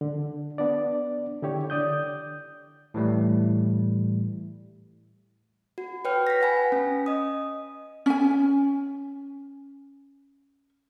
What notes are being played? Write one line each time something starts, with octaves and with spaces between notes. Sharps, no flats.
D3
B3 D4 D5
D3 E4 G4 C#5
D3 D5 D#6 G6
A2 E3 G3 A3
F#4
B4 C#5 G5 F6
A#6 B6
B4 F#5 G#5 B5
C#4
D#5 D#6
C#4 G#5